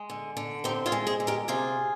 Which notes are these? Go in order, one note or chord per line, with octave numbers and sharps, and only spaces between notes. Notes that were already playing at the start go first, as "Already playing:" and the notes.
Already playing: G#3
D3
D3
C4 D#4 G4
F4 G#4
G#3
G#4 C5
D3
G4 A#4
C3 F4 G#4